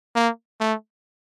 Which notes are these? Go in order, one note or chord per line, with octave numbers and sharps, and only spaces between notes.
A#3
A3